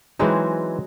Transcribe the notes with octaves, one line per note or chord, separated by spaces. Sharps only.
E3 F#3 G#3 C4 D#4